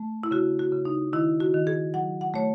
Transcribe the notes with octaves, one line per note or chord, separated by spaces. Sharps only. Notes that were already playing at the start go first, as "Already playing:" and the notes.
Already playing: A3
E4
C#3 F#4
F#4
C#3
D#4
D#3 E4
F#4
D#3
G#4
F#3 F#5
F#5
A3 C#5